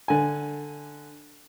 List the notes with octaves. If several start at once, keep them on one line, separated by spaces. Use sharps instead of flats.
D3 G#5